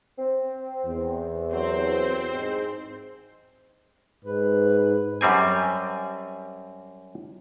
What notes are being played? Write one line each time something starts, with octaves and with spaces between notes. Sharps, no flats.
C4
E2
C2 F#3 C4 C5
G#2
G#2 B4
F#2 G3 C4 G#5